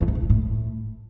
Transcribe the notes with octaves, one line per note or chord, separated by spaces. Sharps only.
E2
F#2
A#2
C3
A2